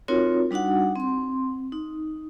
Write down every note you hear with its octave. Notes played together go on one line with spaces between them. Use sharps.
C4 D#4 F4 F#4 A#4 C#5
G3 D4 D#4 F#4 F#5
C4 C6
D#4